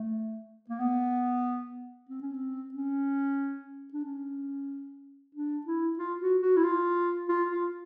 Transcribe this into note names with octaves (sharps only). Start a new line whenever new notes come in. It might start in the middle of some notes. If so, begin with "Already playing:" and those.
Already playing: A3
A#3
B3
C4
C#4
C4
C#4
D4
C#4
D4
E4
F4
F#4
F#4
E4
F4
F4
F4